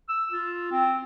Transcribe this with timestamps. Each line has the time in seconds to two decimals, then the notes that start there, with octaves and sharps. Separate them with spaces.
0.09 E6
0.31 F4
0.71 C4